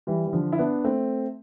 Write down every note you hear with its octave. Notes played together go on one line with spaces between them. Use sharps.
E3 G3
E3
D3 F3
E4
B3 D4
A3 C4